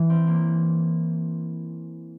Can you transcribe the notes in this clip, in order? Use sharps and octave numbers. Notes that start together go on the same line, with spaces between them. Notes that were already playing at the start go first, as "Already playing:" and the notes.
Already playing: E3
C4
A#3